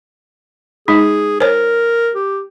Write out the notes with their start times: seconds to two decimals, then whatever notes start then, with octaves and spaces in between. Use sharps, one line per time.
0.88 G#3 D#4 G#4
1.40 A#4 C5 C#5
2.15 G4